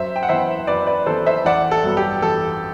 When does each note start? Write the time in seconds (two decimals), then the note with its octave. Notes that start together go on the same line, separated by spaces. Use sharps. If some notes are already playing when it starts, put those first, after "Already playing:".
Already playing: F#2 C5 E5
0.16 G5
0.23 F#5
0.29 E3 B3 C5 E5
0.67 F#2 B4 D5
0.87 B4 D5
1.06 E3 B3 A4 C5
1.26 C5 E5
1.45 A1 D5 F#5
1.71 A4
1.84 G2 F#3 B3
1.97 G4
2.22 A1 A4